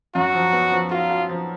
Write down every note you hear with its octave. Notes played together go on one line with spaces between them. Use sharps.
F#2 F#4
F3
B3
F3
F4 F#4
F#4
F3